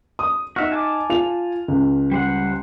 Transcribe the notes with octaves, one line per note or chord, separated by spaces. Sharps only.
D#6
D#4 F#4 E5 F6
G#5 A5 D6
F4 F7
C#2
G3 C5 F#5